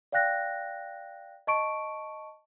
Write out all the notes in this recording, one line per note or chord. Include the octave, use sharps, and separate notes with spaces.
D5 F5 G5 F#6 A#6
D#5 A5 C#6 D7